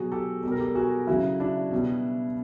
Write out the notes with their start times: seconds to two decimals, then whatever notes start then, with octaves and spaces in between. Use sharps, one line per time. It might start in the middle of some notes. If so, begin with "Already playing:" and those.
Already playing: B2 F#3 F#4 G#4
0.12 G4 A4
0.43 B2 A4
0.47 G3 A#4
0.60 G4 A4
0.75 F#4 G#4
1.07 C#3 F#3 E4 F#4
1.40 D4 E4
1.71 B2 G3